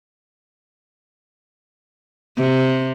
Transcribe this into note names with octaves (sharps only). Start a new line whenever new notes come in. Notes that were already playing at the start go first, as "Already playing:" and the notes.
C3